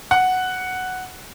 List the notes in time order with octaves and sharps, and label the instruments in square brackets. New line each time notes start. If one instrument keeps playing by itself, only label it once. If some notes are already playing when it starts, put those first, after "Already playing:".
[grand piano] F#5